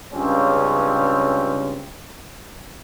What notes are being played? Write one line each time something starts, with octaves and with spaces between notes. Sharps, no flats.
C#2 G2 C#3 C4 C#4